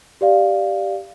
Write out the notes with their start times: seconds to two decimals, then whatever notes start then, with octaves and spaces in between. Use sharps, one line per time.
0.21 G4 D5 F5